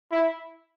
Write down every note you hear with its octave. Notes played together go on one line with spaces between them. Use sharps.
E4